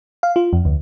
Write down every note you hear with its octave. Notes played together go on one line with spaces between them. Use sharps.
F5
F4
F2
D2